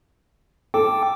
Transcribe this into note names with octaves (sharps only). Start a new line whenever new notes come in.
A4 G5 D6